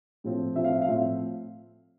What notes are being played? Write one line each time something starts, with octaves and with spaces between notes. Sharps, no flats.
A2 F3 C4
A2 F3 C4 E5
F5
E5
F5
A2 F3 C4 E5